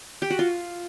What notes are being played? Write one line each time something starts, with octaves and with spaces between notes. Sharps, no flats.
G4
F#4
F4